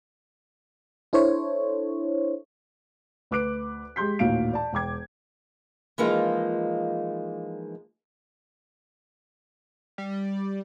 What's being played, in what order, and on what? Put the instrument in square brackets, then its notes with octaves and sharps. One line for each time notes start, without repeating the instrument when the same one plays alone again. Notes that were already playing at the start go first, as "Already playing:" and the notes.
[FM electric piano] D4 E4 A4 C5 C#5
[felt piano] D2 B4 D6 F#6 D7
G#3 G4 C6 G6 B6
A1 D#2 A#2 F#4 F5 D7
D5 A5
E1 G5 D6 G#6
[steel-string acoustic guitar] E3 F3 G#3 A#3 D#4 F4
[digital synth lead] G3